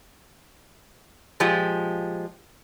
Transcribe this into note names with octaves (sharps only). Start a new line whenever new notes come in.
A#2 F3 G#3 G4